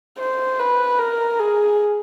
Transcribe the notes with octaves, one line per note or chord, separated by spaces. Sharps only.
C5
B4
A#4
G#4